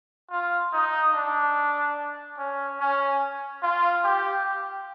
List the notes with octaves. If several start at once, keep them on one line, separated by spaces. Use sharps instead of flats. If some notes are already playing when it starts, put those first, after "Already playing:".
F4
D#4
D4
C#4
C#4
F4
G4